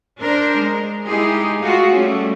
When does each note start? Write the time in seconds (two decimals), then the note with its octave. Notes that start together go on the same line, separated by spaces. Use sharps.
0.20 D4 A#4 C5
0.58 G#3
1.05 G#3 D#4 E4 G4 G#4
1.62 A3 F4 F#4 G#4
1.95 G3 A3 C#4